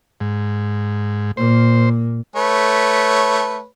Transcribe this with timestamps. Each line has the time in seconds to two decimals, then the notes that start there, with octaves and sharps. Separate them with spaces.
0.21 G#2
1.37 A#2 A#3 C5
2.36 A3 B4 C#5